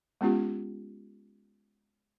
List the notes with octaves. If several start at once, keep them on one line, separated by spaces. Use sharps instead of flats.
G#3 B3 C#4 F4 G4